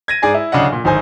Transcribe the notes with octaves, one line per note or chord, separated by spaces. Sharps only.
G#6 A#6 D#7
G#2 G#4 D5 G#5
E4
D1 C#3 D4 D#5 F#5
A#2
D1 G#1 D#4 C5 G#5